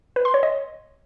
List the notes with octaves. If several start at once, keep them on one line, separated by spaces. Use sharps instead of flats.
B4
C6
C#5
D#5